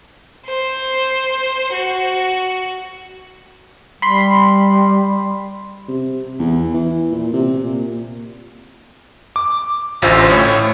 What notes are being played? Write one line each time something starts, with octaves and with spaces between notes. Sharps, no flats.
C5
F#4
G3 B5 C6
C3
E2
E3
A#2
C3
A#2
D6
A1 D2 F4 C5 E6
A2 C#5